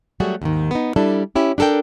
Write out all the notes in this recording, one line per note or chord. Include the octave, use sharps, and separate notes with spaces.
F#3 G3 A3 F#4 G#4
D#2 G#2 D#3
B3 D#4
G3 D4 E4 A4
C#4 E4 G4
D4 G4 A4 A#4 G5